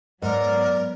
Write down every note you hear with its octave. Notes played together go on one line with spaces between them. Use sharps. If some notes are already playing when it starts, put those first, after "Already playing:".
G#2 F#3 G#3 B3 A#4 D5